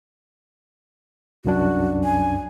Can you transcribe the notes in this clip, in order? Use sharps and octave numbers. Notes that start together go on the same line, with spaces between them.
C2 F#2 D4 F#4
G#5